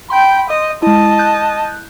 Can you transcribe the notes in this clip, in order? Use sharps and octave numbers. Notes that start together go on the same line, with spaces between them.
G5 B5 C6 G6
D#5
G#3 E4 D#5 A5
F#6 G6